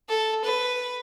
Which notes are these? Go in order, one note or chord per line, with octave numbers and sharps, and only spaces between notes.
A4
B4